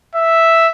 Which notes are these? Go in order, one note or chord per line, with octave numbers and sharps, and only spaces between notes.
E5